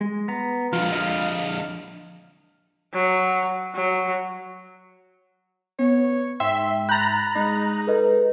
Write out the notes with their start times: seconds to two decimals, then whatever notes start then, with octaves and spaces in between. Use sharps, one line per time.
0.01 G#3
0.28 B3 A#5
0.73 F2 D3 F4
0.92 D#5 F5
2.94 F#3
3.75 F#3
5.79 B3 C#5
6.40 G#2 E5 G5 C6
6.89 A#5 B5 F#6 G6 A6
7.36 G#3 D#4
7.87 A4 B4 D#5